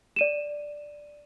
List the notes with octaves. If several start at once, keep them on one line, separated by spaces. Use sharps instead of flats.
D5 D#7 E7